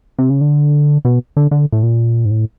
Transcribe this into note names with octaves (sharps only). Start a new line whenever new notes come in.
C3
C#3
D3
B2
D3
D3
A2
A#2
G#2
A2